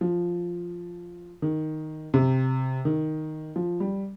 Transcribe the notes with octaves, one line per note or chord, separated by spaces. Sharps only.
F3
D#3
C3
D#3
F3
G3